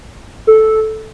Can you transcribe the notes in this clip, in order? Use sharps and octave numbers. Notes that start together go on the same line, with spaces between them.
A4